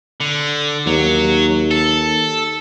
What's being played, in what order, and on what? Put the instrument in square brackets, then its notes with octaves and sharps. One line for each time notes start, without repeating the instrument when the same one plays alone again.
[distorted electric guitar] D3
[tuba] D#2 [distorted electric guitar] F#3
[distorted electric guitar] A4